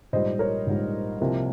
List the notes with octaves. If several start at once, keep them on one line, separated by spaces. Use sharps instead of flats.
A#1 G#2 G3 C5 D#5
A#4 C#5
A#1 G#2 G3
C2 C3 F3 A#3